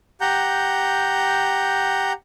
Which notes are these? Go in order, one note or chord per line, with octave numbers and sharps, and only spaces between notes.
G4 F#5 A#5 G6